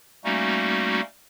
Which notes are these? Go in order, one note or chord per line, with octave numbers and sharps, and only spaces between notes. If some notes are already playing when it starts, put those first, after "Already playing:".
G3 A3 A#3 C#4 D#4 F#4